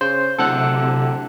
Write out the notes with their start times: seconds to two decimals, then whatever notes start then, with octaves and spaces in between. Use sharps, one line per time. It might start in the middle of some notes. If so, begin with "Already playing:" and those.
0.01 C#3 C5
0.39 D1 C3 A4 F#5 F#6